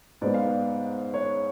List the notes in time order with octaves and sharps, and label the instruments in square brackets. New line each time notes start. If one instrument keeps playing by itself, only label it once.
[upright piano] G#2 G#3 B3 [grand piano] D5
[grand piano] F5
D5
C#5